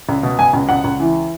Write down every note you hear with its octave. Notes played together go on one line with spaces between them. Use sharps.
C#2
B2
B2 G#5
C#2
C#2 F#5
C#2
E3